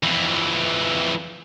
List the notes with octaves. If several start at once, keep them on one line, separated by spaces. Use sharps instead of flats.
F2 E3